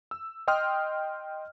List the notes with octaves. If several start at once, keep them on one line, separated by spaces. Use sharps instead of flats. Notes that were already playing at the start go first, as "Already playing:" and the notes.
E6
D#5 G5 C6 D#6 F6